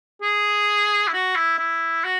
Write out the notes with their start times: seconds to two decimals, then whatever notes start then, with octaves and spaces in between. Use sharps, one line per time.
0.22 G#4
1.07 E4
1.13 F#4
1.36 E4
1.59 E4
2.04 F#4